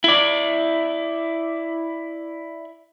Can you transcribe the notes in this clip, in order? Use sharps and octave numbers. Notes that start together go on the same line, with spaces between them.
E4 D5